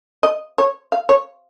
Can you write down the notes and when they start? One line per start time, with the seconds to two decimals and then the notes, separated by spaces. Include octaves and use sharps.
0.23 D#5
0.58 C#5
0.92 F5
1.09 C#5